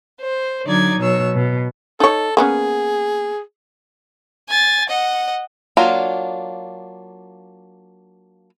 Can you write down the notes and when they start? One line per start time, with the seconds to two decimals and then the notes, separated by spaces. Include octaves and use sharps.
0.22 C5
0.65 D3 F#3 D#4 D5 G#6
0.99 B2 F#3 C#5 E6
1.35 B2
2.00 D#4 A4 C#5
2.37 A#3 B3 C#4 G#4
4.49 G#5 A6
4.89 D#5 F#5
5.77 F#3 A#3 D4 F4